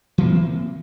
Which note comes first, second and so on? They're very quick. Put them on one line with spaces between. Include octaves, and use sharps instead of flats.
E3 C4 A#3